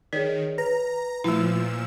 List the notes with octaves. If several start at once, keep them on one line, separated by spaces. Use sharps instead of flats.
D#3 G#4 C#5 D5 B6
B4 A#5 A#6
A#2 F3 A3 E4 E6